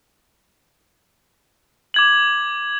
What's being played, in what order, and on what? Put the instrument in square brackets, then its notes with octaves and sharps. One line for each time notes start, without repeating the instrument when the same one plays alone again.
[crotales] D6 G#6 F#7